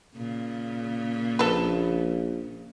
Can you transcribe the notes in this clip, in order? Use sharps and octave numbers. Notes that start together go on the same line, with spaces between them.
A#2 C#3
A#1 A4 B4